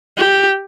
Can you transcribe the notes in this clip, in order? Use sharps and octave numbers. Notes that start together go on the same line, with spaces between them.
G4